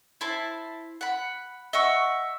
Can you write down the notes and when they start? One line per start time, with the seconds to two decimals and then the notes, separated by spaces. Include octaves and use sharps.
0.21 E4 C5 A5
1.01 F#5 B5
1.73 D#5 E5 F#5 C#6